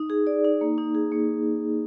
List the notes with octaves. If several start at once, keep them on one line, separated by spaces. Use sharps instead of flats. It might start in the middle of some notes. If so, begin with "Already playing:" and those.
Already playing: D#4
G#4
D5
D#4
A#3
D#4
G#4
A#3